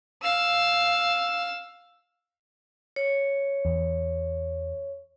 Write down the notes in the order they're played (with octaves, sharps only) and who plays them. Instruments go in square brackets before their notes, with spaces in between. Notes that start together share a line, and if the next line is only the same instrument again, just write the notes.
[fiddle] F5 E6
[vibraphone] C#5
[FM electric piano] E2